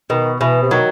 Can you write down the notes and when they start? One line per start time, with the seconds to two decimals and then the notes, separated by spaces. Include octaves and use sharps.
0.10 B2 D#3
0.41 B2 E3
0.62 C3
0.71 D#3 F#3